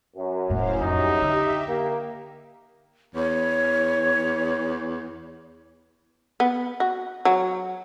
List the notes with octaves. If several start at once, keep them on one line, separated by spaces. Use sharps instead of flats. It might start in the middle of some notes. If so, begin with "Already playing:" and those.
F#2
E1 A2 E4 C5 F5
F2 A2 D#4 G4 E5
D3
A#3 G4
E2 C#5
B3
F#4
F#3